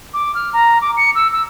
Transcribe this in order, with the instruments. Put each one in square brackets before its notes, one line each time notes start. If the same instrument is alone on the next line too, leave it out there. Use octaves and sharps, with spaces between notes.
[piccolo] D6
F6
A#5
D6
C#7
E6
E6